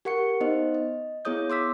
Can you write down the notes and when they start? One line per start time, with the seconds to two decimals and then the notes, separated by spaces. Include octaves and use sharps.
0.05 G4 A#4 F#5 C#6 C#7
0.40 B3 D#4 C5 D#5
0.75 D#5
1.25 B3 E4 G#4 C#5 D#6 G6
1.50 C6 D6 E6 B6